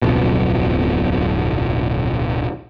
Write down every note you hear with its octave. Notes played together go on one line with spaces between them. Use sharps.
D1 B1 F2 B2